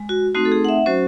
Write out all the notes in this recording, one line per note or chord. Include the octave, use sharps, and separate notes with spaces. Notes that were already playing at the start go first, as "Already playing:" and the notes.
Already playing: G#3
F#4
A3 C4 D#4 F#4
A4
G#4
F#5
E5
F#3 C#4 F#4 C5